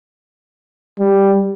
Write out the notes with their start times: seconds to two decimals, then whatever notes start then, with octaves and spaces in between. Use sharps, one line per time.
0.99 G3